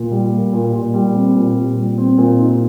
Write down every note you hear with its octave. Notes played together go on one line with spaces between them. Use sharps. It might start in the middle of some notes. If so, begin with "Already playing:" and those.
Already playing: A#2
G3
A#3
A#2
A#2
G3
C4
A#2
A#2
G3
C4
A#2
D#4